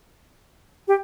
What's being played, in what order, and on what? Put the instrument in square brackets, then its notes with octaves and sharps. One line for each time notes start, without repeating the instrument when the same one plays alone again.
[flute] G4